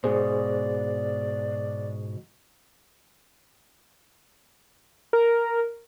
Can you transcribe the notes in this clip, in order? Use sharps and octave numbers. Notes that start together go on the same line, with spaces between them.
G#2 B2 G#4 C5 D5
A#4